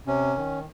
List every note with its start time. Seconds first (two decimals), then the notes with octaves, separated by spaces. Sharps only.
0.07 C3 C#4
0.36 D#3